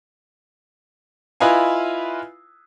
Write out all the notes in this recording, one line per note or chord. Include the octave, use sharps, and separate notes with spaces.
E4 F4 B4 D#5 F5 G#5